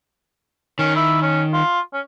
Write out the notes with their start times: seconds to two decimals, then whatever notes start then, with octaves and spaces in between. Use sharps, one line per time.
0.79 D#3 C#4
0.96 E4
1.22 C#4
1.53 F4
1.93 C#4